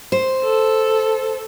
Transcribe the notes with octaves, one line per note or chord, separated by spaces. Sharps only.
C5
A4